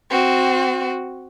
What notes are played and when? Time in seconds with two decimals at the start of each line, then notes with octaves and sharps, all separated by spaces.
0.11 C4 F#4